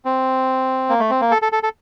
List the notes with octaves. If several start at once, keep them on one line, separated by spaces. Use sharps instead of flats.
C4
A#3
A3
C4
A#3
A4
A4
A4
A4